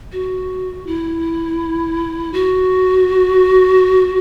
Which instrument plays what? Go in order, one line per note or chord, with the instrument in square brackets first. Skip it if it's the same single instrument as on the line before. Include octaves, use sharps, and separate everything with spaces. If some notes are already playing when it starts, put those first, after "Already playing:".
[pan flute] F#4
E4
F#4